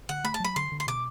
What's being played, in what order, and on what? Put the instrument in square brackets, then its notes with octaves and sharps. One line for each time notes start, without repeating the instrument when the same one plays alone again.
[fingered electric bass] D3 [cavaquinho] F#5
[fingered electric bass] A3 [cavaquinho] B5
[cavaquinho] A5
[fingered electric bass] F#3 [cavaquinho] B5
[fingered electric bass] D3 [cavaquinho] C6
[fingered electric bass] D3
[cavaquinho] C6
[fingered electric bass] B2 [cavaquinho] D6